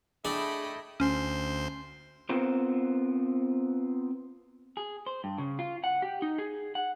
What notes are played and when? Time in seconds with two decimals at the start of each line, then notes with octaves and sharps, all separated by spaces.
0.25 A3 D4 E4 G#4 D#5 G5 B5
1.00 D2 C#4 C5 C6
2.29 B3 C4 F4 A#4 C5
4.77 G#4
5.06 C5
5.24 G2
5.38 C#3
5.59 F4
5.84 F#5
6.02 G4
6.22 D#4
6.38 G#4
6.75 F#5